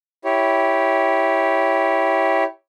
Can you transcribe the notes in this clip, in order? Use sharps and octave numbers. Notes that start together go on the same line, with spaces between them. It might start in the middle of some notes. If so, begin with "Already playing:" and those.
E4 G4 C#5